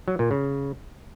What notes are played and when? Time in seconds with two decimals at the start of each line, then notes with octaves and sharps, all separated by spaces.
0.08 F#3
0.19 A#2
0.31 C#3